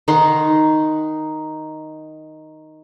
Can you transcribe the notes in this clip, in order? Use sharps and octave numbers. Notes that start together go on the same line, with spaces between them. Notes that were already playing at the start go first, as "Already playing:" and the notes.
D#3 D#4 F#5 C6